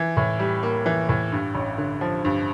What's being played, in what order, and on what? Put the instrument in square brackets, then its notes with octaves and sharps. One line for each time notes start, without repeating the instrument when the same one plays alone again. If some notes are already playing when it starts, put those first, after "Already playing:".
Already playing: [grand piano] E3
A2
G3
A#3
E3
A2
G2
A1
D3
F3
G2